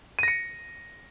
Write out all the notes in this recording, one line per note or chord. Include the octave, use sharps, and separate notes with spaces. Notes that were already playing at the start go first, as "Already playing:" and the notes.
A#6 C#7 D#7